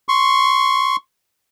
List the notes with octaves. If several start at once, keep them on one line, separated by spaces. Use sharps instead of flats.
C6 C#6